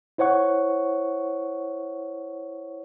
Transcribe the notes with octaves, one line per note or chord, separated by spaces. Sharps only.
E4 C5 C#5 F#5 C#6